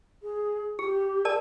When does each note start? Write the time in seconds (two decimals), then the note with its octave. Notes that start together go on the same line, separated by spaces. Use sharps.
0.22 G#4
0.79 G4 G#4
1.25 G#4 A#4 D5 A5